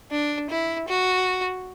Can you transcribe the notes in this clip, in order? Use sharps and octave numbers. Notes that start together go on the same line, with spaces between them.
D4
E4
F#4